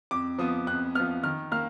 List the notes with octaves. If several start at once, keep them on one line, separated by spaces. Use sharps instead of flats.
F2 D6
F3 B3 D#6
F2 F#6
F3 B3 F6
D#3 F6
A#3 F6